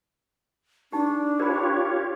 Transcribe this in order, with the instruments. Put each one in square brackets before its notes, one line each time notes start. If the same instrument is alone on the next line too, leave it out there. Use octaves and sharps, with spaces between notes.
[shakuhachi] D4 [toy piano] D#4 G4
[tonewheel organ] F4 G4 C#5 [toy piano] A#4 C5 B5